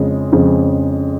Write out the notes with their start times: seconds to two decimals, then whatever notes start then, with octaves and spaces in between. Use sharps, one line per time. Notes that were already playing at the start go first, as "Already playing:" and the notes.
Already playing: F2 C#3 G#3
0.32 F2 C#3 G#3